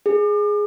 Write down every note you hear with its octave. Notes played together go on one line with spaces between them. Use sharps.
G#4